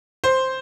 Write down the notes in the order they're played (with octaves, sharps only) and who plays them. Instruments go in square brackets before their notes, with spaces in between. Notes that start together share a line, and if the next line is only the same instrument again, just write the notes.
[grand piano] C5